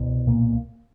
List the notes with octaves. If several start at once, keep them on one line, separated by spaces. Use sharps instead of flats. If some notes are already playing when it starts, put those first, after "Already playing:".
Already playing: C2 B2
A#2 A#3